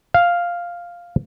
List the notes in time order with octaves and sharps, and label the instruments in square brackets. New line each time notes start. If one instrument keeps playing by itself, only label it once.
[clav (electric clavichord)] F5